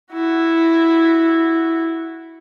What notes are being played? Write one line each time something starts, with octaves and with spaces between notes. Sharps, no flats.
E4 F#4